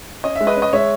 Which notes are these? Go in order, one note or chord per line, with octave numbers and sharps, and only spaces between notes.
C#4 D#5
G#3 E5
B4 D#5
C#4
D#5
G#3 C#5 E5